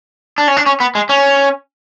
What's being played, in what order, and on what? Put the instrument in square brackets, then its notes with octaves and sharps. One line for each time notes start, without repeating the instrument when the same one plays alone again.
[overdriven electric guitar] D4
C#4
D4
C#4
B3
G#3
C#4